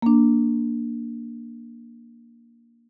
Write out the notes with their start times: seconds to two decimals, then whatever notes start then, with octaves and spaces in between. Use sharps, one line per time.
0.02 A#3 D4